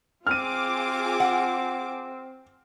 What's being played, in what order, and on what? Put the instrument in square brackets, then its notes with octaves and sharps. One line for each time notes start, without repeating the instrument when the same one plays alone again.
[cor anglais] C4 [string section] F4 G#4 D6 [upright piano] F6 D#7
[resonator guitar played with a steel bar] F#5